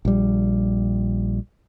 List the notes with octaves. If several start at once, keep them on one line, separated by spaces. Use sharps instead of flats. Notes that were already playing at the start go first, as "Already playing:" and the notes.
A#1 G3